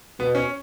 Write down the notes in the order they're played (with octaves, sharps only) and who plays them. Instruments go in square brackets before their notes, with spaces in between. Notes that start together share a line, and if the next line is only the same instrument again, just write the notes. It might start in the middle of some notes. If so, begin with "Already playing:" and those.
[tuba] B2 [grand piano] B3
[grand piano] C#4